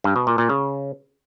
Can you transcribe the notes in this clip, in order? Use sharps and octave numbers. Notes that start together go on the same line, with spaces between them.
G2
B2
A#2
A#2
C#3